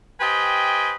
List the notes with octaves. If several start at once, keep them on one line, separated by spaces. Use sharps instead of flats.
G4 B4 C5 D#5 G5 G#5